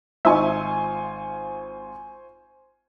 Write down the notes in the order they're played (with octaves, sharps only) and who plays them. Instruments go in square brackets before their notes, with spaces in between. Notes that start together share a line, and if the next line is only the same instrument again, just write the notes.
[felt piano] G#1 F4 [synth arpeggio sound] D#4 E5 [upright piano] C5 G#5 C#6